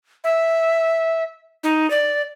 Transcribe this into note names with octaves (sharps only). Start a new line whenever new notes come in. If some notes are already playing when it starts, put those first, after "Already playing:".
E5
D#4
D5